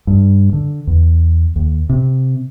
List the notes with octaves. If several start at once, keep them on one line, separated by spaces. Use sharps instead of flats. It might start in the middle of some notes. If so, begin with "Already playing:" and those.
G2
D3
E2
D#2
C3